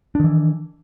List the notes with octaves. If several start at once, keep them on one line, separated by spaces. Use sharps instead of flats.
D#3 E3 D4